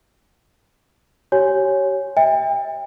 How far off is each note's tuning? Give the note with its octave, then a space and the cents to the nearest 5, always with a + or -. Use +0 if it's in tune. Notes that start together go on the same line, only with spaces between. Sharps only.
G4 -35 C#5 +0 G#5 -5
E5 -30 G5 +40